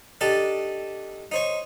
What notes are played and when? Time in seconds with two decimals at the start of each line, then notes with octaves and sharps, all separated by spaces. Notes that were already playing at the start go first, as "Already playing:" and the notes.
0.21 D4 D#4 G4 A4 D5
1.32 D#4 C5 C#5